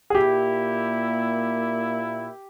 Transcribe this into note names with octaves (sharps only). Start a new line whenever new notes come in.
G#4
A#2 A#3 E4 G4